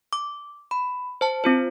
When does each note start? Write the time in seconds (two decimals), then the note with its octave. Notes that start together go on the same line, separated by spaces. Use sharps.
0.13 D6
0.71 B5
1.21 C5 A5
1.44 C4 F4 C5